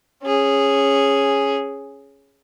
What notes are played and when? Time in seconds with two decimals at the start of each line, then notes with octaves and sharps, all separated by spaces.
0.23 C#4 G#4